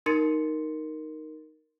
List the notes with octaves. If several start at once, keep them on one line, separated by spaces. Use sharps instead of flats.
D#4 A#4 C6 A6 C#7